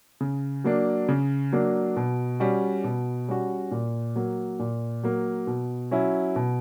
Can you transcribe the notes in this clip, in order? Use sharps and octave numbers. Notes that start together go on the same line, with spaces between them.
C#3
F#3 A#3 D4
C#3
F#3 A#3 D4
B2
G3 C#4 F#4
B2
G3 C#4 F#4
A#2
F#3 A#3
A#2
F#3 A#3
B2
F#3 C#4 E4
B2